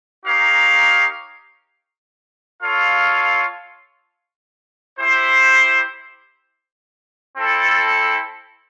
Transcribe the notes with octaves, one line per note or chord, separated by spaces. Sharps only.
D#4 G4 A#4 C#5 F5
F4 A4 C#5 F5
E4 G4 C5
C4 E4 A4